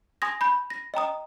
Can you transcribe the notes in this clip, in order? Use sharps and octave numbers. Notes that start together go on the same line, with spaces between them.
G#5 C6 D#6 G#6 A#6
B5 G6
A#6
D#5 G5 A#5 D#6